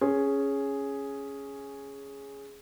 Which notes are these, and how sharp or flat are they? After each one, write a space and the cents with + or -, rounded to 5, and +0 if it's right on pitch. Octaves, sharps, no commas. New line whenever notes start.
C#4 +0 G#4 +0